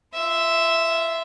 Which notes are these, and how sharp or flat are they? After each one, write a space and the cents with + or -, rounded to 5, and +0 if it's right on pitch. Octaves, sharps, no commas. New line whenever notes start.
F4 -25 E5 +0